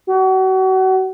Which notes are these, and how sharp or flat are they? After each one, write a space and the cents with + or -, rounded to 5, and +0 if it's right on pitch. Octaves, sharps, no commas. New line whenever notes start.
F#4 +35